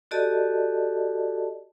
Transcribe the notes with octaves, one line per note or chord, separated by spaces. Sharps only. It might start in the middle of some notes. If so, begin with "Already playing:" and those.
F#4 G4 A4 D5 D#5 A5